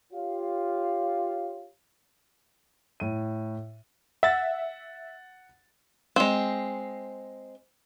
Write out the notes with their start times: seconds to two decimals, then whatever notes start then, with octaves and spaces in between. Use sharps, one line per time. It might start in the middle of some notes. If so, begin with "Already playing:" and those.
0.13 F4 G4 C#5 F5
3.00 A2 D#7
4.23 E5 F#5 A6
6.16 G#3 C4